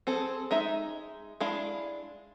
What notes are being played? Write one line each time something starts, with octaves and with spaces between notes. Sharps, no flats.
C4 G#4 A4
G#3 D#4 E5
G#3 D4 E4 F5